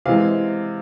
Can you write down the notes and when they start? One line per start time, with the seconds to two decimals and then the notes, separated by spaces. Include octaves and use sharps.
0.05 C3 E3 G#3 F5